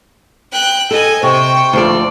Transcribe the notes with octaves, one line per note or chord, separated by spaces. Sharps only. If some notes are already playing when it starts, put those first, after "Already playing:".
G5 F#6
A4 D#5 G#5
C3 C5 G5 C#6
D2 F3 D5